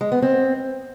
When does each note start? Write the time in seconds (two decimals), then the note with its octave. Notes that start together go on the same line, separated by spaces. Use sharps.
0.01 G#3
0.12 B3
0.22 C4